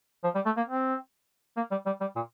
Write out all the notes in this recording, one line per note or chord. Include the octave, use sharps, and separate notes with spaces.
F3
G3
A3
A#3
C4
A#3
G3
G3
G3
A#2